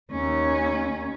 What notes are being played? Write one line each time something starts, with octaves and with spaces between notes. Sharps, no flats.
D#2 C#4